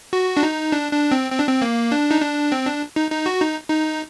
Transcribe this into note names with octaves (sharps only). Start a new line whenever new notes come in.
F#4
D4
D#4
D4
D4
C4
C4
D4
C4
A#3
D4
D#4
D4
C4
D4
D#4
D#4
F#4
D#4
D#4